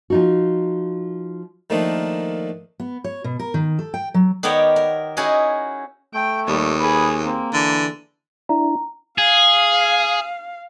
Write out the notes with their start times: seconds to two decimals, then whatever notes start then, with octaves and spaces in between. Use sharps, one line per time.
0.10 F3 D#4 F#4
1.70 D#3 F3 A3 A#3 D4 D#4
2.80 B3
3.04 C#5
3.24 B2
3.39 A#4
3.54 D#3
3.79 A4
3.94 G5
4.14 F#3
4.43 D#3 B3 G4 A#4 C#5 D5
4.76 A#4
5.17 C#4 D#4 E4 F#4 G#4 D#5
6.14 A3 G5
6.47 D#2 G3
6.80 G#4 B4
7.24 A#3 C4
7.53 D3 E3
8.49 D4 E4 A#5
9.18 G#4 F5